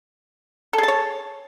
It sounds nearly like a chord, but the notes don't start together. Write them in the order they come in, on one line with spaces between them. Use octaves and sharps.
A4 G#4 A5 C#5